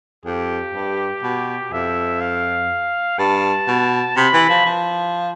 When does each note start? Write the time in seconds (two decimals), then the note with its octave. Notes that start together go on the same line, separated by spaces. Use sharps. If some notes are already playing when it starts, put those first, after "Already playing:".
0.25 F2 G4
0.74 G2
1.23 B2
1.72 F2 E5
2.21 F5
3.19 G2 A5
3.68 B2
4.16 C3 B5
4.33 E3
4.49 F3
4.66 F3